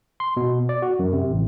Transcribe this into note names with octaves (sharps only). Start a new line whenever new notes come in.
C6
B2
D5
F#4
F#2
C3
A1